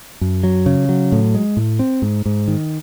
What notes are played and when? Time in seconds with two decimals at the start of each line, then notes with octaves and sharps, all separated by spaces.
0.21 F#2
0.43 F#3
0.66 C#3
0.89 F#3
1.12 A2
1.35 G#3
1.57 A2
1.79 C4
2.02 G#2
2.26 G#2
2.48 D#3